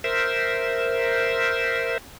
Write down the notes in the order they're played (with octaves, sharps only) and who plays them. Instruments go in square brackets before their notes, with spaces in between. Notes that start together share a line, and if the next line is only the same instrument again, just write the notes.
[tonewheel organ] A#4 C5 E5